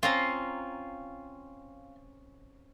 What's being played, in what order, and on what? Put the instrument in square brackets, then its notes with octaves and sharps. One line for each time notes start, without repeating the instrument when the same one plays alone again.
[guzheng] C4 C#4 A#5 [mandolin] F4